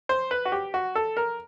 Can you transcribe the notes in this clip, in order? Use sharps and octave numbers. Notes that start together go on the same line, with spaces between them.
C5
B4
F#4
G4
F#4
A4
A#4